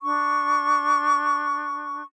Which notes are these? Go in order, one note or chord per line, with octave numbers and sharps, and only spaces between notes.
D4 C#6